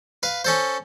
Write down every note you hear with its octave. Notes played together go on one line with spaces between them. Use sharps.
B4 F5
C#4 A4 C5